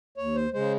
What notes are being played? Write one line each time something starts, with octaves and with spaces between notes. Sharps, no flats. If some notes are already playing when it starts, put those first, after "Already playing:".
D#2 C#5
C5
C#3 G#3 C5